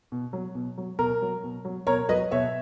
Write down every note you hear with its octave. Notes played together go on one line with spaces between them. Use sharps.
B2
F#3
B2
F#3
B2 A#4
F#3
B2
F#3
B2 A#4 C#5
F#3 B4 D#5
B2 C#5 E5